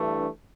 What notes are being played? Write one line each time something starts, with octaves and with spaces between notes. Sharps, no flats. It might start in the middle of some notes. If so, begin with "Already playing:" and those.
Already playing: G2 E3 A3 D4